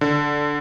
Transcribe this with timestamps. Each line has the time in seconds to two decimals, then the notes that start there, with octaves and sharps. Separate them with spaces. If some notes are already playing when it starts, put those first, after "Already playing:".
0.01 D3